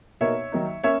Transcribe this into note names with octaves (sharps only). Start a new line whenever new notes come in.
B2 A#3 D#4 C#5 E5
D#3 F#3 A#3 D#4
A#3 C#4 C#5 E5